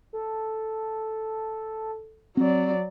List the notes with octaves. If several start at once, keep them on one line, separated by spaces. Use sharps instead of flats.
A4
F#3 C4 D5